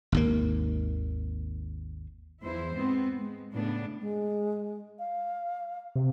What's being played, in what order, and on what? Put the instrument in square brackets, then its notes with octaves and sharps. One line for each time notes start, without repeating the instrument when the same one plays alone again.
[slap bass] G#1 D#2 A#3
[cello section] E2 E3 F3 E4 C5
G#2 G#3 B3 C4
G#3
A2 C#3 B3 D4
[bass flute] G#3
F5
[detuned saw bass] C3